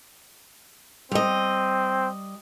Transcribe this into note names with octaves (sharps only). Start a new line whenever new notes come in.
G3 C4 D#5